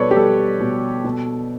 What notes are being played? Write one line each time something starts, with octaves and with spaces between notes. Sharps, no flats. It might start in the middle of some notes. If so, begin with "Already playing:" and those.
Already playing: B2 G3 A4 B4 C#5 D5
G4
G3 A4
B2
B2